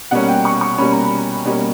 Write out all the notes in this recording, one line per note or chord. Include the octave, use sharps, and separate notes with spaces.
B2 G3 A#3 C#4 F#5
G5
C#6
C#6
B2 G3 A#3 C#4 B5
A#5
B5
B2 G3 A#3 C#4